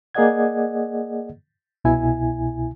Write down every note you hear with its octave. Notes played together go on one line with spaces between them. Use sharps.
A#3 G#4 D5 D#5 F#5 G#6
C2 B2 E4 G#5